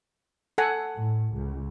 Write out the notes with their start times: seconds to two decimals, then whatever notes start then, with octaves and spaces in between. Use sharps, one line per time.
0.58 A4 F#5 G#5
0.94 A2
1.33 C#2